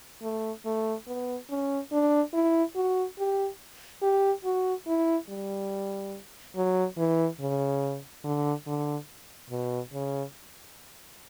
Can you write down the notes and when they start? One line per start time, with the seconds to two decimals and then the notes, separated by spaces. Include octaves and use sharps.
0.22 A3
0.65 A3
1.07 B3
1.50 C#4
1.92 D4
2.34 E4
2.76 F#4
3.19 G4
4.02 G4
4.44 F#4
4.87 E4
5.29 G3
6.56 F#3
6.98 E3
7.40 C#3
8.24 D3
8.67 D3
9.50 B2
9.93 C#3